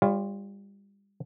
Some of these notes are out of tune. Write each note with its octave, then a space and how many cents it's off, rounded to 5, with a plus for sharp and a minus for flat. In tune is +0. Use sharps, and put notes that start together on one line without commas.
G3 +30 F4 +0 C#5 +0